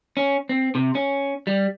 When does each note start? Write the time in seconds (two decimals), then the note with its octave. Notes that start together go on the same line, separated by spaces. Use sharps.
0.17 C#4
0.49 C4
0.75 C3
0.95 C#4
1.47 G3